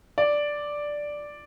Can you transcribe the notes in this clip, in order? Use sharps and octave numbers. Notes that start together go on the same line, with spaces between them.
D5